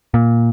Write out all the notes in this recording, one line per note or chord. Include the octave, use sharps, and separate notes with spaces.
A#2